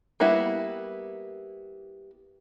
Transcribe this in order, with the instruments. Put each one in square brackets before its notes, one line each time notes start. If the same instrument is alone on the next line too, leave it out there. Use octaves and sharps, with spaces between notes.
[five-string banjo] G3 A#3 B3 E4